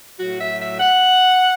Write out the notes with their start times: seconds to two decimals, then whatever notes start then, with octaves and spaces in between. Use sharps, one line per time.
0.19 A2 F#3 A3 F#4
0.39 E5
0.60 E5
0.80 F#5